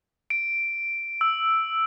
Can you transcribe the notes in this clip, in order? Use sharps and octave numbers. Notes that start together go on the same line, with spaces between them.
D7
E6